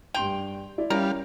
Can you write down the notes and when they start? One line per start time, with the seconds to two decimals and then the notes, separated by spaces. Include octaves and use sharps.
0.14 G2 G5 C6 F7
0.78 E4 D5
0.90 G3 C#4 E4 A#4 F5